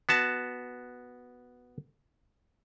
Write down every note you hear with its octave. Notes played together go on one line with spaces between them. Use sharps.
B3 F#4 A5